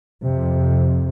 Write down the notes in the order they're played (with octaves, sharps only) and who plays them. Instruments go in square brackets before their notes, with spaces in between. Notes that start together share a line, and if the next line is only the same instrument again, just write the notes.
[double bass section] F2 C3